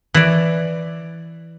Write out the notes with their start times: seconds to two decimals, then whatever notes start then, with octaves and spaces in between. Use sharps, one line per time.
0.14 E3 D5